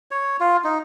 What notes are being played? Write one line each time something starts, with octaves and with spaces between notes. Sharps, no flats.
C#5
F4
D#4